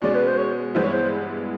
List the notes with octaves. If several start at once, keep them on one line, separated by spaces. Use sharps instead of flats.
B2 G#3 C#4 D5
B4
C5
C#5
G2 E3 G#3 B3 E4 C5
C#5
C5